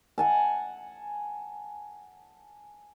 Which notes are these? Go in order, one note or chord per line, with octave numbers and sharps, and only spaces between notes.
F#5 G#5 A5